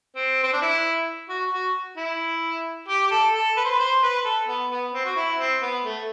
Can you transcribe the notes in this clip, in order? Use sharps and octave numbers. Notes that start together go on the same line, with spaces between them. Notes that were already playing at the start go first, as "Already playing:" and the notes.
C4
C4
D4
E4
F#4
F#4
E4
G4
G4
A4
A4
B4
C5
B4
C5
B4
A4
B3
B3
C4
F#4
E4
C4
B3
A3